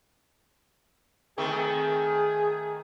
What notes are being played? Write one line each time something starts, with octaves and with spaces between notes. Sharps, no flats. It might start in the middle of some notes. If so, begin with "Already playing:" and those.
D#3 A3 C4 G#4